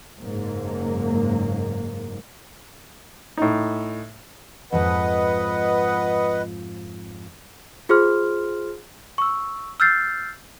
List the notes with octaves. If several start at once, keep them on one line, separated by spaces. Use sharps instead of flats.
F#1 G#2 A#3
A2 D#4
F2 G#2 F3 B4 D#5 F#5
F4 G#4 C5 C6 F6
C#6 E6
E6 F6 G6 A6 C7